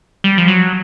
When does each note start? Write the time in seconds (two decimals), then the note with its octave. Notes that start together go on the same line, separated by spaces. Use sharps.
0.24 G3
0.38 F3
0.48 F#3